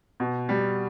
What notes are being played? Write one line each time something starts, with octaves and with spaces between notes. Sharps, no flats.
B2
G3